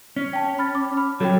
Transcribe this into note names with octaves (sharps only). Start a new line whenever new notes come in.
C#4
G5 A5
B5 F6 A6
D6
B5 F6
F#3 A4 C#5 G5